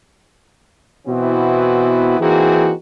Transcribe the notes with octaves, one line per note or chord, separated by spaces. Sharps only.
B2 E3 B3 C4 E4 F#4
E3 A#3 C4 D#4 F#4 G#4